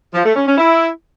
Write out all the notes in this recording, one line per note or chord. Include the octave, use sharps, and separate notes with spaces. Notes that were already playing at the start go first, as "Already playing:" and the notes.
F3
A3
C#4
C#4
E4